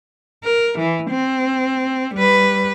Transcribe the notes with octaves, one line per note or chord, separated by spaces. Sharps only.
A#4
E3
C4
G3 B4